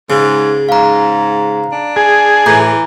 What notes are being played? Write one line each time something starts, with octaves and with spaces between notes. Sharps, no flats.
G#2 C#3
G#2 F5 A#5
D4
G#4
A2 E3 A#5 D6 G6